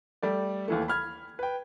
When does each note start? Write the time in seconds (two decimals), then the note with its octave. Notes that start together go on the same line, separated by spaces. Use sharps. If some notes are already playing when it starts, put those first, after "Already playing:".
0.23 G3 A3 D5
0.68 D#2 E3 A3
0.88 B5 F6 G#6
1.39 B4 G5